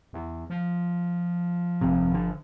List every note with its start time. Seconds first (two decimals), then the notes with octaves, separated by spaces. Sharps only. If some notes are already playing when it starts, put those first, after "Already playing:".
0.13 E2
0.50 F3
1.81 G1 F2 C3
2.11 G1 D3